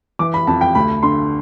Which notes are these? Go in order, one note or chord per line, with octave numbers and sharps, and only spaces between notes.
E3 D6
B5
F2 A5
G5
D2 B5
D3 C6